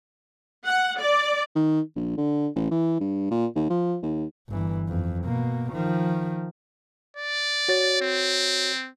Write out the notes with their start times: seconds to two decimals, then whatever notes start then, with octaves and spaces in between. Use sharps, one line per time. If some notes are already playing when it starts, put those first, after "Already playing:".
0.65 F#5
0.99 D5
1.55 D#3
1.96 A#1
2.17 D3
2.55 A1
2.71 E3
3.00 G2
3.31 A#2
3.55 D#2
3.70 F3
4.02 D#2
4.49 G1 E3
4.88 F2
5.25 B2 A#3
5.72 D#3 F3
7.17 D5
7.68 F#4 C#5 A6
8.02 C4